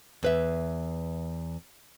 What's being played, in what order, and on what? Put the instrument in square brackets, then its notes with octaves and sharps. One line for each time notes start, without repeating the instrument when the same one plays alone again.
[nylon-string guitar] E2 B4 E5